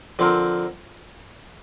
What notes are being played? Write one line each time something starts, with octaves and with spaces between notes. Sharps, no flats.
D3 F3 C4 A#4